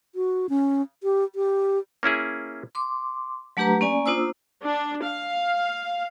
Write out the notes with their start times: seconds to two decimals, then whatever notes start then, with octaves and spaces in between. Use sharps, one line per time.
0.15 F#4
0.49 C#4
1.03 G4
1.35 G4
2.03 A#3 C#4 E4 G#4
2.75 C6 D6
3.57 F#3 A3 D4 G4 B4 A#5
3.81 A#3 C#4 D5 G#5
4.06 A#3 D4 F4 C5 D#6 E6
4.63 D4
5.03 F5